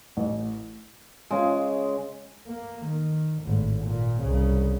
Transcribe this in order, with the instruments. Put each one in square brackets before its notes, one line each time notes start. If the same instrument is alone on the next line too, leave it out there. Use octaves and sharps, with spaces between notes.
[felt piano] A1
[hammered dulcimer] C#3 G#3
[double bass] A#3
D#3
G#1 A2
A#2
C2 C#3